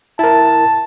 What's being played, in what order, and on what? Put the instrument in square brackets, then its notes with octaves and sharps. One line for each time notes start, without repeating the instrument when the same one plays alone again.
[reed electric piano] E4 A#4 [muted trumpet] A5